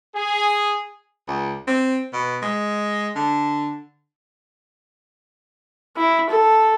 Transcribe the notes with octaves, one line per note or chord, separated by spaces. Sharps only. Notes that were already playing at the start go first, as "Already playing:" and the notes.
G#4
C#2
C4
B2
G#3
D3
E4
A4